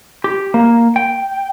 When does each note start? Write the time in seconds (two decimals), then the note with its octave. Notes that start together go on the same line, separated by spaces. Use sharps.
0.24 G4
0.54 A#3
0.96 G5